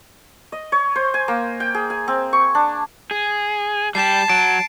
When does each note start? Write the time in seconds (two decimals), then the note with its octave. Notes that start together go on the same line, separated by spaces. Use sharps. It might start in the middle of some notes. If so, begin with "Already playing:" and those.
0.52 D#5
0.72 C#5
0.96 C5
1.14 G#5
1.28 A#3
1.60 G5
1.75 G#4
1.90 G#5
2.08 C4
2.33 C#6
2.55 D4
3.11 G#4
3.95 G3 G4 A5 C7 E7
4.30 F#3 D7